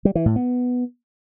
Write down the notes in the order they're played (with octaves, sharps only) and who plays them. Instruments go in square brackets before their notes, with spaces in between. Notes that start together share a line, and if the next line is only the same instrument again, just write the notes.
[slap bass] G3
E3
A2
B3